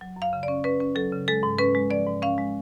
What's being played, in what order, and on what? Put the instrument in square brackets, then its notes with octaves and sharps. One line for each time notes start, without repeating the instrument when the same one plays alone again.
[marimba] F#3
F#2
F5
C#3
D5
C#4
C#4 B4
C#4
F#3 A4
C#3
G#3 A4
G#2
C#4 B4
G#3
F3 D5
G#2
C#4 F5
G#3